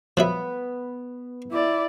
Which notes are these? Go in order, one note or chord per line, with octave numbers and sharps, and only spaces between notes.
F3 F#3 B3 B4 E5
E4 D5